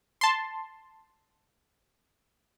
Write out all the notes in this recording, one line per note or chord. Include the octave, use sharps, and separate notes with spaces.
A5 C6